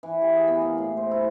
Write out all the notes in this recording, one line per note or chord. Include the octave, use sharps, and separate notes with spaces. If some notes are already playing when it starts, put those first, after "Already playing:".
E3
G4
G#4
B3
A#3
A2
C5
E4